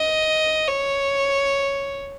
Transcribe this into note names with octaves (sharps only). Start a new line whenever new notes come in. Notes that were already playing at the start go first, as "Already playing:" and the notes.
Already playing: D#5
C#5